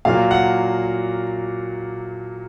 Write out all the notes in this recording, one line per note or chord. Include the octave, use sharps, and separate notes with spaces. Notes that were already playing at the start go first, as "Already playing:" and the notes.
A#2 F#3 A#3 F5
F#5